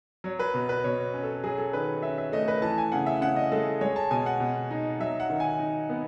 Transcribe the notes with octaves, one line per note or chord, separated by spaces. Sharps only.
F#3 C#5
B4
B2
B4
B2 C#5
C#4
A4
F#3 G#4
A4
D#3 B4
C#4 E5
E5
A3 D#5
B4
E3 A5
G#5
C#3 F#5
E5
C#3 F#5
D#5
G#3 A4
G#3 C#5
A5
B2 G#5
F#5
B2
D#4
F#3 E5
F#5
D#3
G#5
D#4
B3